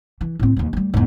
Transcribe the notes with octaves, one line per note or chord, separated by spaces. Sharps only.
E3
A2 C4
D#2 E3
D2 G3
E2 G#2